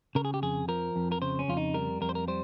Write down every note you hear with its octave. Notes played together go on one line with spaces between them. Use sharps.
C#3 A#4
G#4
G4
F2 G#4
F3 A#4
F2
A#4
C#3 C5
C#4
F2 F4
D#4
G3 A#4
F2 A#4
C5
A#4
G3 C5